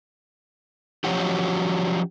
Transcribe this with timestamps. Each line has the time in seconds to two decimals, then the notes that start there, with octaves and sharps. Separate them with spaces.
1.04 F3 F#3 C#4 F#4 G4